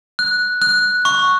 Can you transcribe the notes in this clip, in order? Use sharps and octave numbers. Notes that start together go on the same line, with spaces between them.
F#6
F#6
C#6